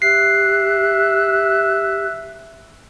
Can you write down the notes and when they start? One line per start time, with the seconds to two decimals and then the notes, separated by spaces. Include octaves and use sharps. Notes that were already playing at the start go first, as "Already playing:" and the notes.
0.02 G4 E5 F#6 C7